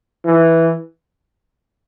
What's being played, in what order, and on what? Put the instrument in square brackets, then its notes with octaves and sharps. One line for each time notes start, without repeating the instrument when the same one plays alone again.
[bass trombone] E3